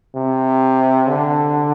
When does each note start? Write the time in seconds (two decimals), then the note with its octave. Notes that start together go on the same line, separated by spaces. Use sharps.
0.15 C3
1.08 D3